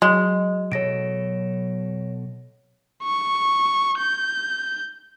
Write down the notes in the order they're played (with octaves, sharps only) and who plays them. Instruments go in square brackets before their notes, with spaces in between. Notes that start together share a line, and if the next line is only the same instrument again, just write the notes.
[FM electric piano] F#3 [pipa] G#3 [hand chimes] D#5
[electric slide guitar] B2 A4 [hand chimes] C#5 A#6 D7
[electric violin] C#6
G6